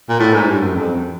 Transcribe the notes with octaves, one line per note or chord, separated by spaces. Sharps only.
A#2
A2
G#2
G2
F#2
F2